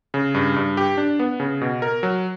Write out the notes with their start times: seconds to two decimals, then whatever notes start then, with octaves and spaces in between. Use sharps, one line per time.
0.14 C#3
0.35 G2
0.56 G2
0.77 G4
0.98 D4
1.19 B3
1.40 C#3
1.61 B2
1.82 A#4
2.03 F#3